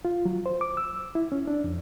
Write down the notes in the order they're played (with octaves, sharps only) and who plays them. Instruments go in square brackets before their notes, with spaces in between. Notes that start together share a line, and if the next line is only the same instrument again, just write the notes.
[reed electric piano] F4
F#3
C5
D6
E6
E4
C#4
D4
F2